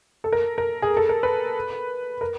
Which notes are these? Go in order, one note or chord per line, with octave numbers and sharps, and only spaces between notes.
A4
A#4
A#4
G#4
A4
A#4
B4
A#4